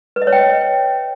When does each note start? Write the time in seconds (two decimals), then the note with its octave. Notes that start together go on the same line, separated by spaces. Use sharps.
0.16 B4
0.22 D#5
0.27 C#5
0.33 G5
0.38 D#5